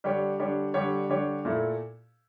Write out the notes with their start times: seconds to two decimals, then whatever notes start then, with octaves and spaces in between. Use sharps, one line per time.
0.04 D3 G3 D4 G4 C#5
0.39 D3 G3 D4 G4 C#5
0.74 D3 G3 D4 G4 C#5
1.09 D3 G3 D4 G4 C#5
1.45 A#2 A3 E4 A4